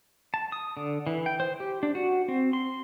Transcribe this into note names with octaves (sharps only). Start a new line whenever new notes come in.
A5
D#6
D3
E3
G5
C5
G4
D4
F#4
C4
C6